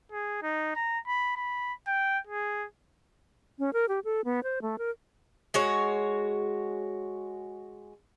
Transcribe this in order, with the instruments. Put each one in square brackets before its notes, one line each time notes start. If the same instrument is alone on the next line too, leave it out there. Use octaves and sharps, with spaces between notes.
[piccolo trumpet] G#4
D#4
A#5
B5
B5
G5
G#4
[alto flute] C#4
A#4
G4
A4
B3
C5
A3
A#4
[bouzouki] G#3 F#4 C#5